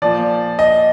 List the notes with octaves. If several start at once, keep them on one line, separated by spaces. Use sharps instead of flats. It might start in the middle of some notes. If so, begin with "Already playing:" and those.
A#2 F3 D5
D#5